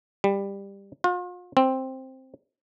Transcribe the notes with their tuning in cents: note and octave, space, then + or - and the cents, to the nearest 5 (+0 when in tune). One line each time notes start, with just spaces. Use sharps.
G3 +15
F4 +40
C4 +5